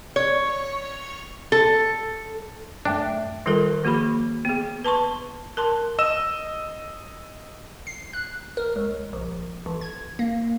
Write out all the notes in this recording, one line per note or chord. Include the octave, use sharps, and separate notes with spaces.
C#5
A4
F#2 A2 A3 D4 E5 G5
D#3 G3 F4 A4 A#4
F3 A#3 F#4 G#4 B5
B3 G#4
B4 A5 C6 C#6
A#4 A5 C6
D#5 E6 E7
C7
F#6
A#4
C#2
A#1
A1
G#6
A#3